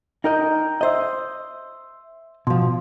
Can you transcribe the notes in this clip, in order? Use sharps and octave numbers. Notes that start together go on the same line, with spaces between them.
D#4 A#4 D#5 G5 A#5 G6
C5 D#5 E5 C6 E6
B2 F3 C6